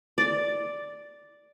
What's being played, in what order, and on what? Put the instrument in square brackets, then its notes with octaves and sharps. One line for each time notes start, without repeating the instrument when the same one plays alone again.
[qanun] D5